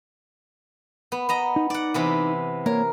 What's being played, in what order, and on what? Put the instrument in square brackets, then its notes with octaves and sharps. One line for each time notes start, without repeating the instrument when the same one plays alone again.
[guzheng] B3
B3 D#5 A#5
[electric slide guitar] D#4
[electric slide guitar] D#4 [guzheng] D5 F#5
[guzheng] C3 E3 B3
[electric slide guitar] A#3 C#5 [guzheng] A#4